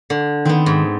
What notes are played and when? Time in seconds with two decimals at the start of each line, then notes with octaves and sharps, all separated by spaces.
0.10 D3
0.45 D#3 B3 C4
0.66 G#2